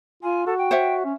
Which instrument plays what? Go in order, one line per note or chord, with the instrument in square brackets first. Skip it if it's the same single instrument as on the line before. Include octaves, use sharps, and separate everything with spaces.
[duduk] F4 [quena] G#5
[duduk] F#4 [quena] A4
[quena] G5
[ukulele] C5 C#5 E5
[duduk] C#4